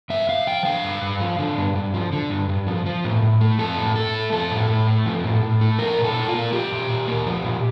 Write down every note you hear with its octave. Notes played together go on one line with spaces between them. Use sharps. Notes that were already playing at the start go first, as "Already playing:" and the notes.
G2 E5
G2 F5
F3 G5
D3 F5
G2
G2
F3
D3
G2
G2
F3
D3
G2
G2
F3
F3
A2
A2
A3
F3 A4
A2
A2 A4
A3
F3 A4
A2
A2
A3
F3
A2
A2
A3
F3 A#4
A#2
A4
A#2
F4
A#3
F3 G4
A#2
A#2
A#3
F3
A#2